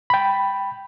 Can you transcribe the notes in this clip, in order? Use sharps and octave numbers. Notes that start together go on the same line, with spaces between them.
G5 B5